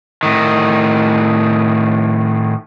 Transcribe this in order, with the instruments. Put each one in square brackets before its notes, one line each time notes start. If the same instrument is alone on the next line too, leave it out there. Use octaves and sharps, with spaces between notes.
[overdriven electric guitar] A2 D#3